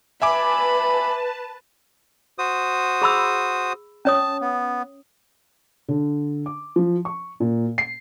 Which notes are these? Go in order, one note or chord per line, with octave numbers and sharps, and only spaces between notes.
B4 E5 G#5 A5 B5 D6
F#4 C5 D#6
G#4 B5 E6
C#4 C#5 A5 D#6
B3
D3
D6
F3
C#6
A#2
C7